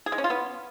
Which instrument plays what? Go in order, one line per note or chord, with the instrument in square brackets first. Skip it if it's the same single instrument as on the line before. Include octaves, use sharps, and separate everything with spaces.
[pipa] G#4
G#3
C#4
F4
B3